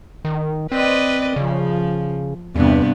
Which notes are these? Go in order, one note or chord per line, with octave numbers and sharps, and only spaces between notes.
D#3
C4 B4 D5 D#5
C#3 F3
E2 G2 C3 B3